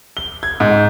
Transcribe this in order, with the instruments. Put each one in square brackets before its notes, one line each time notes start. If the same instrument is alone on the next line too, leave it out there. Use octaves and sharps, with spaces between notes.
[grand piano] G7
G#6
G#2